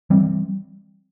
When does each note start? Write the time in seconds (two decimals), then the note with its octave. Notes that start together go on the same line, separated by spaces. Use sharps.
0.10 E3 G3 C4